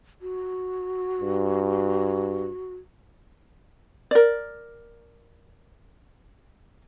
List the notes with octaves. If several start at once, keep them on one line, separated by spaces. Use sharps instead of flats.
F#4
G2
A#4 D5